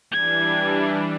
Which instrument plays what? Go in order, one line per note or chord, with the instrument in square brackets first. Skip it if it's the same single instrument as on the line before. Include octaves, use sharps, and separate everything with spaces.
[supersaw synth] E3 G3 D4 [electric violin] G#6